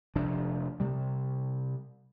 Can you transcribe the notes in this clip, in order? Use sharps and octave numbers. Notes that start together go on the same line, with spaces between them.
F1 C3 F3 D4
C3 G3